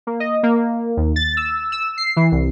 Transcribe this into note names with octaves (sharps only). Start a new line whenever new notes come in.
A#3
D#5
A#3
D#2
A6
E6
E6
C7
E3
C2